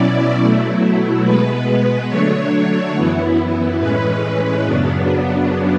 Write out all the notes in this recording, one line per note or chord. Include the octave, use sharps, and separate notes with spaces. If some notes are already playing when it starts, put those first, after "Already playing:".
Already playing: B2 F#3 C#4 E4 D5
B2 F#3 A3 E4
B2 G#3 B3 B4
D3 F#3 A3 D4 C#5
F#2 E3 B3 E4
A2 E3 G#3 C#4 B4
F#2 C#3 F#3 B3 D4